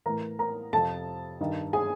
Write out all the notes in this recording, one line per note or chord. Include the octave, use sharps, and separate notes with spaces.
A2 E3 A#4 A#5
A#4 A#5
F2 C3 F3 A4 A5
G2 D#3
G#4 G#5